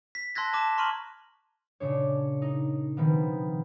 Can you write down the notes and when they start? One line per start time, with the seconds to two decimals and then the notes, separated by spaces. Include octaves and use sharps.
0.15 B6
0.35 A5 C6 E6 F#6 G#6 A#6
0.53 A5 D6 A#6 E7
0.77 A#5 C6 C#6 F6 D#7 F#7
1.80 A#2 C#3 D4 C#5
2.42 D#4
2.97 B2 D#3 F3 B3 C4